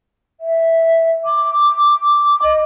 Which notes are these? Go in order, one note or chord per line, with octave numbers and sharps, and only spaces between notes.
E5
D6
D#5